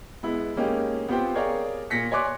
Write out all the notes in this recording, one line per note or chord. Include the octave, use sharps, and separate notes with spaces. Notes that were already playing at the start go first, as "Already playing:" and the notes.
G#3 B3 E4
G#3 A#3 C#4 D#4 G4
B3 C4 F4 G4 C5 G5
G#4 A#4 C#5 D5 F5 G5
A#2 A#6 B6 C#7
C#5 D5 G#5 C6 D6 F#6